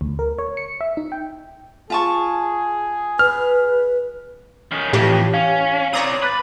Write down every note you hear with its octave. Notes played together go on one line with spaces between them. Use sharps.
D2
A#4
C#5
C#7
E5
D#4
G5
F4 G#4 A5 C#6
B4 F6
D#3 C#4
F2 A2 E3 G4 C#5
C#4 F5
C4 C#5 D5 A#5 D#6
B4 D6 F#6 A6